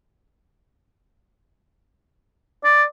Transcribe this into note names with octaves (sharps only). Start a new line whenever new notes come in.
D5